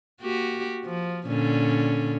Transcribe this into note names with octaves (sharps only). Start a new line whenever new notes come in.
A#3 F#4 G4
F3
A#2 D3 C#4